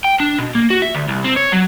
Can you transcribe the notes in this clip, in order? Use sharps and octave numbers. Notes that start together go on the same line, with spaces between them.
G5
D4
B2
A#3
F#4
E5
D2
C2
C4
C#5
F#3